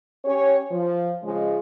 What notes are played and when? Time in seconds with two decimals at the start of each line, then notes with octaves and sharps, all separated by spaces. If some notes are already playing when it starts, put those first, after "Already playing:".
0.25 C#4 G4 C#5
0.71 F3
1.23 C#3 F3 G#3